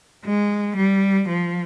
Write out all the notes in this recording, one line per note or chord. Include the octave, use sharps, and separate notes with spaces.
G#3
G3
F3